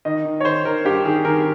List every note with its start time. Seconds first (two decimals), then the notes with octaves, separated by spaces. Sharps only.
0.05 D#3 D#5
0.25 D#3
0.41 C#5
0.45 D#3 C5
0.65 D#3 A#4
0.85 G2 G4
1.05 D#3 G#4
1.25 D#3 A#4